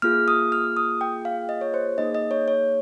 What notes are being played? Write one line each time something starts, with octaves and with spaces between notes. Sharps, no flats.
A#3 F4 G#4 F6
D#6
F6
D#6
G5
F5
D#5
C#5
C5
A#3 D#4 G#4 D#5
D#5
C#5
C#5